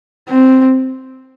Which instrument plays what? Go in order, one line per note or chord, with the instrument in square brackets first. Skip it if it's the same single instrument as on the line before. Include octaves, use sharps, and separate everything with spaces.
[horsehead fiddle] C4